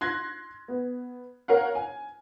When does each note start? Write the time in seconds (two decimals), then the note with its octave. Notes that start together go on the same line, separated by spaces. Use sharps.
0.01 C6 F#6 G#6 A#6
0.68 B3
1.48 A#4 C#5 F5 F#5
1.75 G#5